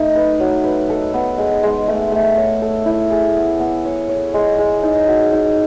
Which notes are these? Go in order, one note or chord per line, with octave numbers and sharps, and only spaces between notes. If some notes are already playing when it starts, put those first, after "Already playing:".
Already playing: A3 D#4 A4
B4
F#3
B4
A4
B3
G#3
G#3
A3
A3
C#5
A4
E4
G#4
B3
B3
C#5
C#5
G#3
G#3
D#4
F#4
D#4